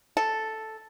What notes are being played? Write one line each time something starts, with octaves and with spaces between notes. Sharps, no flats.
A4